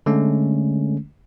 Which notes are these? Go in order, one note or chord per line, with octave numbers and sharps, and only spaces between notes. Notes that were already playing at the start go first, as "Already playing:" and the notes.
D3 G#3 A3 C#4